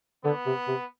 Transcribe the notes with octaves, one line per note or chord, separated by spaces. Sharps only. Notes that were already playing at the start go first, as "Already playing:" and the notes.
D3 B3
C3
C3